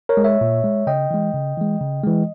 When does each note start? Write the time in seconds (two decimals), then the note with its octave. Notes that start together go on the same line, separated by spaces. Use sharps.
0.09 A#4 C#5
0.17 G#3
0.24 C#5 E5
0.41 A#2
0.64 G#3
0.87 C#3 D#5 G5
1.11 E3 G#3
1.34 C#3
1.57 E3 G#3
1.81 C#3
2.04 E3 G#3